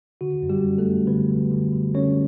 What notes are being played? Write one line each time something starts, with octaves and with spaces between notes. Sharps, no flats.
D3 F#4
F#2
G3 G4
F#2
A3 A4
F#2
D3 B3 B4
D3
D3
D3
D3 C#4 C#5